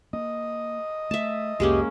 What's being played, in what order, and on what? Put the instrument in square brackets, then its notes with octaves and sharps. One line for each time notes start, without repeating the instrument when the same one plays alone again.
[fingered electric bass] A#3 [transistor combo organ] D#5
[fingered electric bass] A3 [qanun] E5 A5
[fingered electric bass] C2 F2 [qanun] G#3 A#3 C#4 [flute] G4